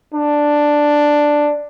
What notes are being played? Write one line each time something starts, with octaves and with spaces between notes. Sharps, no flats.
D4